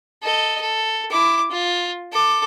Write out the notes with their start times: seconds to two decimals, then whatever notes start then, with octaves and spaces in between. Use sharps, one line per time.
0.23 A4 D#5
0.61 A4
1.12 E4 D6
1.51 F4
2.13 A4 D6